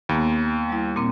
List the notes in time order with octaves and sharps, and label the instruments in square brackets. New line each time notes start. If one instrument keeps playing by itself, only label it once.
[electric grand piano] D#2 [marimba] A#3 B3
[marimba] G3 E4
A#2 A#3 C4